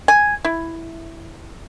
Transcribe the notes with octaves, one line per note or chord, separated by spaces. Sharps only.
G#5
E4